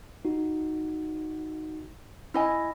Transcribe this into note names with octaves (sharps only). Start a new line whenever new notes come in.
D#4 F#4
E4 D#5 G#5